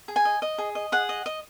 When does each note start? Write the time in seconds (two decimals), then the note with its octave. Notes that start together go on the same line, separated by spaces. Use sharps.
0.08 G#4
0.16 G#5
0.25 D#5
0.42 D#5
0.58 G#4
0.75 D#5
0.92 G#4 F#5
1.09 D#5
1.26 D#5